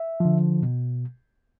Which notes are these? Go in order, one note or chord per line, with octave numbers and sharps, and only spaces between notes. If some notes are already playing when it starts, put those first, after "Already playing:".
Already playing: E5
D3 F3
B2